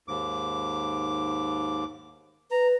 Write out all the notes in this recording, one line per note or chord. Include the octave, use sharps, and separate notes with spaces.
D#2 G#2 D6
B4 A#5